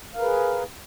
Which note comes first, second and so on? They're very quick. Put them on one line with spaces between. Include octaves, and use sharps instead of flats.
F5 A#4 B4 G#4